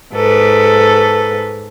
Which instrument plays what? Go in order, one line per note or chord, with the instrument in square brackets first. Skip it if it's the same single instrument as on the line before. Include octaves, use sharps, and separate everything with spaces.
[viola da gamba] G#2 A4 B4